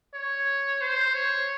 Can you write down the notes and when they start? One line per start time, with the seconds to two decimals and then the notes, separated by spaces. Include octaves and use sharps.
0.14 C#5
0.81 C5
1.14 C#5